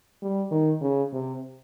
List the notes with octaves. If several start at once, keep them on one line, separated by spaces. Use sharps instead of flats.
G3
D#3
C#3
C3